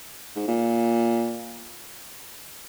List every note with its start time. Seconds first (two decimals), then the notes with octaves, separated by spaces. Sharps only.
0.36 G#2
0.48 A#2